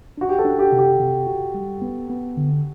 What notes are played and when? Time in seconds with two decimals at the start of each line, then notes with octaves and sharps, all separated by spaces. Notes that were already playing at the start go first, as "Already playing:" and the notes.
0.18 D4 F#4
0.29 G4
0.39 A4
0.45 D4
0.59 G4
0.72 C3
0.78 G4
1.00 C3
1.27 F#4
1.55 G3
1.82 B3
2.10 B3
2.37 D3